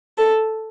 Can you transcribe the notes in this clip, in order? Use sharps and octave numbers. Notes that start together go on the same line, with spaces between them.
A4